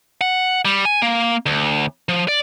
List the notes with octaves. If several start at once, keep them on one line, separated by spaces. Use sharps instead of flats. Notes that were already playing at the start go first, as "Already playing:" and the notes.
F#5
G3
G#5
A#3
D2
F3
D5